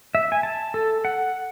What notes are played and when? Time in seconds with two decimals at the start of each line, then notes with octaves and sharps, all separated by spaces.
0.15 E5
0.32 G#5
0.43 A5
0.74 A4
1.05 F#5